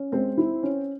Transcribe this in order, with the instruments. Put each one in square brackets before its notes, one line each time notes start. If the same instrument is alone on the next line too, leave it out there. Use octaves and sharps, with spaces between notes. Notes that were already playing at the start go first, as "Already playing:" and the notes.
Already playing: [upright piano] C#4
G#3 C4 C5
E4
C#4